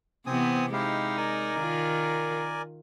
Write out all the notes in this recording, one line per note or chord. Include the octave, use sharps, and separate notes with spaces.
C3 E3 B3 C4 G#5 D#6
G#3 D#4 E4 G4 F5
A#4 D5 G#5
D#3 F4